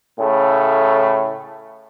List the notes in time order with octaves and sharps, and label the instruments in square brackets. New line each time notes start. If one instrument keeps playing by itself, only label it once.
[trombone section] A2 C#3 A3